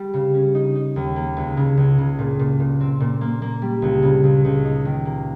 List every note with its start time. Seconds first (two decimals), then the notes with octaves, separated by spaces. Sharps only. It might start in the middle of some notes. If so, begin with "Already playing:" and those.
Already playing: G3
0.14 C#3
0.34 C#4
0.55 D#4
0.75 D#4
0.96 D#2
1.16 A#3
1.37 C#2
1.57 C#3
1.77 C#2
1.98 C#3
2.19 A#2
2.39 A#2
2.60 A#2
2.81 C4
3.00 A#2
3.21 A#3
3.42 A#3
3.62 G3
3.82 C#2
4.03 C#3
4.24 C#2
4.44 C#2
4.65 D#4
4.85 D#3
5.05 A#3